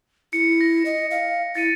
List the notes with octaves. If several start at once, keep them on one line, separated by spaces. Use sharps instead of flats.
E4 C#7
A#6
D#5
F5
E4 A6 C#7 D#7